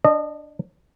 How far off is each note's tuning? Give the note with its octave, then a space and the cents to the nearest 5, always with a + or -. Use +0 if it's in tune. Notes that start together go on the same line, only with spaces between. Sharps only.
D4 +0 D#5 -25